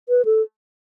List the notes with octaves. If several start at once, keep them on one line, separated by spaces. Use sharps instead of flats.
B4
A4